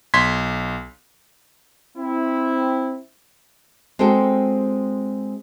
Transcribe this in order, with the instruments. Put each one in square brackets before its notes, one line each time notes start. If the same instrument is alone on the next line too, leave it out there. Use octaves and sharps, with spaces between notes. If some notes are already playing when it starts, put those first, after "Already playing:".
[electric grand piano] B1 C6 G#6 B6
[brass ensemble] C4 E4
[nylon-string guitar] G#3 C4 F#4 A4 G5